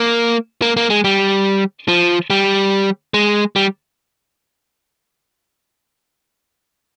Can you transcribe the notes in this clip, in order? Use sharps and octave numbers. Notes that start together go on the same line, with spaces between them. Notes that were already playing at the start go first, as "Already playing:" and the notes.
Already playing: A#3
A#3
A#3
G#3
G3
F3
G3
G#3
G3